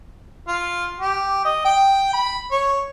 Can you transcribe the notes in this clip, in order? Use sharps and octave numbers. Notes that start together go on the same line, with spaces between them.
F4
G4
D#5
G5
B5
C#5